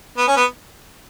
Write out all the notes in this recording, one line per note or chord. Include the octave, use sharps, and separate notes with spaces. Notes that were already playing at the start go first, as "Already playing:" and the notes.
B3
C#4
B3